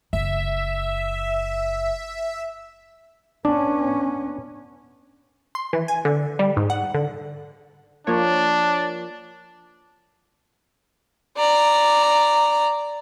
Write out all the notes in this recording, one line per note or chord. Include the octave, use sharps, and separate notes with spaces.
F#1 E5
B3 C#4 D4
C6
E3
G#5
D3
G3
G#2
F#5
D3
F3 A#3 D4 C#5
D5 A#5